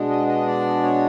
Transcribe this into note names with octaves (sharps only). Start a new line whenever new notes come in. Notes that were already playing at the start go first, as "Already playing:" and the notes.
Already playing: B2 G#3 B3 D4
D#5
D#5
D5
C#5